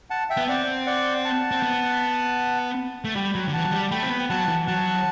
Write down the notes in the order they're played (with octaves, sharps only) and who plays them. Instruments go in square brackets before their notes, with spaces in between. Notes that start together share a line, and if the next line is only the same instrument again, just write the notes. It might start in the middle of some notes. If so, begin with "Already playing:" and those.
[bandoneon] F#5 A5
E5 G5
[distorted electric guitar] B3
[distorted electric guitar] C4 [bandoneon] D5 F#5
[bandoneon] D5 F#5
F#5 A5
[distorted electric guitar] C4
B3
A3
[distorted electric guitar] G3 [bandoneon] G5 B5
[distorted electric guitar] F#3
D3
[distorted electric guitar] E3 [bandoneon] F#5 A5
[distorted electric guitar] F#3
G3
[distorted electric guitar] A3 [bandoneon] G5 B5
[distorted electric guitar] C4
B3
[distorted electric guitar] F#3 [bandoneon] F#5 A5
[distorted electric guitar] E3
[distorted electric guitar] F#3 [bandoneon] F#5 A5